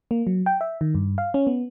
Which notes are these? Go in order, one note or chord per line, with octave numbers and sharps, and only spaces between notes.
A#3
F#3
G5
E5
D#3
G2
F5
C#4
B3